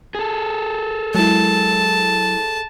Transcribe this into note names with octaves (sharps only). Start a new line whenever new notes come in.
G#4 A4
F#3 G#3 E4 A5